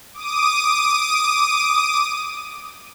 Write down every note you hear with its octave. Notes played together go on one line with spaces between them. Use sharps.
D6 D#6 D#7